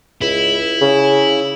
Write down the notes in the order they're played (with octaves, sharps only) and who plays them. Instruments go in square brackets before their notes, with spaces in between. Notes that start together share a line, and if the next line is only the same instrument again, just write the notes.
[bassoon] C#2 [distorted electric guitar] E4
[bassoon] C#3